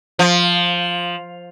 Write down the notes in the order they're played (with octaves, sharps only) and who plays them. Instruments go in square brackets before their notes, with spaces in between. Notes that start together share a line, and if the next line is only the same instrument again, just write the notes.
[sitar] F3